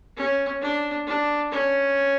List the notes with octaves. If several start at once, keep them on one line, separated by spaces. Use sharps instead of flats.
C#4
D4
D4
C#4